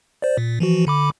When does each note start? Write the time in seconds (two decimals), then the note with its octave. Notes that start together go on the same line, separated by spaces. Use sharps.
0.22 C5 D5
0.38 A#2
0.60 E3 F3 F#4
0.87 D3 B5 D6